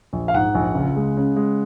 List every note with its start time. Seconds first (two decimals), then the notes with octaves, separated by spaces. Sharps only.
0.13 A#1
0.28 F5
0.34 G#2 F#5
0.55 A#1
0.75 C#2
0.96 G#3
1.17 C#3
1.36 G#3